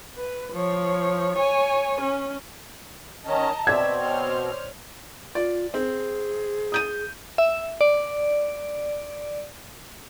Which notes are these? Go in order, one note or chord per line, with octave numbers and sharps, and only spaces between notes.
B4
F3 C#5
C#5 G#5
C#4
D#3 C#4 D#5 A5 A#5
B2 C4 D5 E5 G#6
C5 C#5 F6
F4 D5
C4 G#4
D#6 G6 D#7
E5
D5